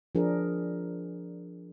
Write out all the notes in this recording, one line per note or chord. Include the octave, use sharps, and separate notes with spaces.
F3 D4 G#4 A#4